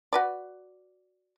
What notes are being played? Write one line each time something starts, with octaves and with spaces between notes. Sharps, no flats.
F#4 B4 D5